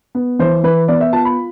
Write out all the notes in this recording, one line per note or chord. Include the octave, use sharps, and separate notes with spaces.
B3
E3 C5
E3 B4
B3 D5
E5
F4 A5
B5